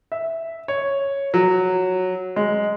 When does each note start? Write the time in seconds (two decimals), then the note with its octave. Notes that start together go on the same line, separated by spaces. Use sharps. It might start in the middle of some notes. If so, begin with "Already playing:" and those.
0.12 E5
0.68 C#5
1.34 F#3
2.36 G#3